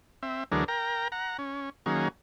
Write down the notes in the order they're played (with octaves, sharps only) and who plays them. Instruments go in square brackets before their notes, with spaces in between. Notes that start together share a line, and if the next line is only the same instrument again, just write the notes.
[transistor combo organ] C4 E5
D2 E3 F#3 D4 G#4 A#4
A#4 G5 A#5
F#5 A#5
C#4
D#3 F#3 A#3 C#4 G#4